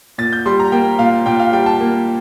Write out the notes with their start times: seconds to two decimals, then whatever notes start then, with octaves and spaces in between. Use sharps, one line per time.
0.18 A#2 A6
0.33 G6
0.46 G3 C6
0.59 A#5
0.72 A#3 G5
0.99 A#2 F5
1.26 A#2 G5
1.40 F5
1.53 G3 G5
1.66 A5
1.80 A#3